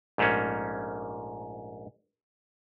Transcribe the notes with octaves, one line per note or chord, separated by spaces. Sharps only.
A#1 G#2 A3 A#3 C#4